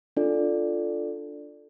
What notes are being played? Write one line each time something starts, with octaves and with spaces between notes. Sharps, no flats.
D4 F4 A4 D5